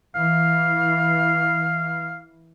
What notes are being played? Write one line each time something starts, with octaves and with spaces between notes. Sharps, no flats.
E3 F5